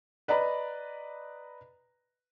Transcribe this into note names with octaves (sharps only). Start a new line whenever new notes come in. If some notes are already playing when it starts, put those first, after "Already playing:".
B4 D5 D#5 A#5 B5